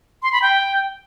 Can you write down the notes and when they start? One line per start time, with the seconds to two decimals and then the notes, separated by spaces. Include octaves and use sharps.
0.23 C6
0.32 B5
0.42 G5